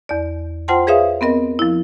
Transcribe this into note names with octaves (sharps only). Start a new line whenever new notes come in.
E2 D5
F4 C5 F#5 G5 A5 C6
G#4 B4 C#5 E5 F5 D#6
B3 C4 A#4 D#5
F3 E4